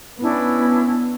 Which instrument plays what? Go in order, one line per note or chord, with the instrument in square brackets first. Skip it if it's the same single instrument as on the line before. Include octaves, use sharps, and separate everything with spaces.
[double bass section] B3 [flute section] C#4 D4 E4